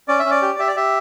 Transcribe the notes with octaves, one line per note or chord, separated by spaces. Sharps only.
C#4 D5
E5
C#4
D5
G4
G4 E5
D5
G4 E5